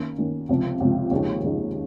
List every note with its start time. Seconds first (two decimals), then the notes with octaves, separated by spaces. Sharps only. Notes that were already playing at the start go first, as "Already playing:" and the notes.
Already playing: D#3 A#3 C#4
0.18 D#3 A#3 C#4
0.49 C#2 C3 F3
0.80 C#2 C3 F3
1.11 D#2 C#3 F3 G#3 D#4
1.42 D#2 C#3 F3 G#3 D#4